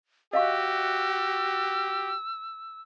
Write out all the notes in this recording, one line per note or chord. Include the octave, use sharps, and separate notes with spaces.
F#4 G4 D#5 F5 C#6 E6